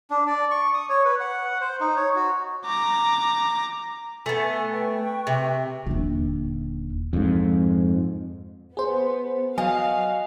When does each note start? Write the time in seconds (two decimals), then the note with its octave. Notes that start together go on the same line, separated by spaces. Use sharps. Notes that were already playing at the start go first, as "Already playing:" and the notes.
0.10 D4
0.27 D5
0.51 C#6
0.74 D#6
0.89 C#5
1.05 B4
1.20 F#5
1.61 C5
1.81 D#4
1.96 C#5
2.16 F#4
2.66 A#5 D6
4.26 A3 B3 G#5
4.71 B4 G5 C#6
5.27 C3
5.86 D#1 D3
7.13 F2 G#2
8.77 B3 G#4 C5
9.58 F#3 F#4 D#5 F5 G#5